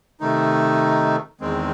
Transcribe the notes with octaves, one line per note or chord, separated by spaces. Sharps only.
C3 D#3 A3 D#4
E2 D#3 G#3 C4